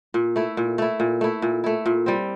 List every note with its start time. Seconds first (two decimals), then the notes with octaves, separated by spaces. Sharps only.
0.14 A#2
0.36 A3 E4
0.57 A#2
0.78 A3 E4
1.00 A#2
1.21 A3 E4
1.42 A#2
1.64 A3 E4
1.86 A#2
2.06 G3 C4